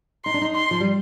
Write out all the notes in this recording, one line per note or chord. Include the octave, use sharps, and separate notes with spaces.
D#4 C6
D4
D#4
C6
F3
G3